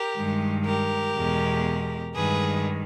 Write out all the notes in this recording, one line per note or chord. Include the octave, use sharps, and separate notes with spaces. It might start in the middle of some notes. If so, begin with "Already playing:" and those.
Already playing: G4 A#4
G2 D#3 G#3
G4 A#4
E2 B2 G#3
G2 D#3 G#3 G#4 B4